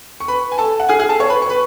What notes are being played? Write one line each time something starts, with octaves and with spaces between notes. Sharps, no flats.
C#6
B4 B5
G#5
A4 A5
F#5
G#4 G#5
G#4 G#5
A4 A5
C#5 C#6
B4 B5
C#6
B4 B5